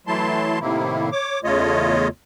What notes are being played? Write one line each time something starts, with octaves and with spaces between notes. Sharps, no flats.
E3 F#3 A3 E4 A5 C6
A2 C3 D#3 A#3 E4
C#5 D6
E2 C#3 A3 F4 C#5 D#5